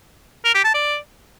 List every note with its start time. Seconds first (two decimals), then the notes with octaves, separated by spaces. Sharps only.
0.45 A#4
0.54 G4
0.64 A5
0.74 D5